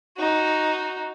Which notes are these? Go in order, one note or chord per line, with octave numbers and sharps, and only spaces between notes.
D#4 F#4